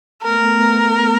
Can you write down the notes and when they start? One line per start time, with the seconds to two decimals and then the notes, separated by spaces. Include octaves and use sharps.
0.23 A3 B3 A#4